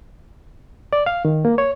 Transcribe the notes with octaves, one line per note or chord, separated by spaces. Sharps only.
D5
F5
D#3
A#3
C#5